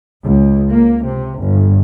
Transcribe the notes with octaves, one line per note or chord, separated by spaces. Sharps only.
C#2
A#3
C3
G1